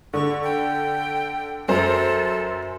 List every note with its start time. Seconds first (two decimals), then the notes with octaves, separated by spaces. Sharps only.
0.14 D3 C#6
0.43 G5
1.68 F#2 A4 C5